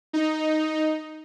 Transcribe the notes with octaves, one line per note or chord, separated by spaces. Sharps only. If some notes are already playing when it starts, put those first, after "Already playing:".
D#4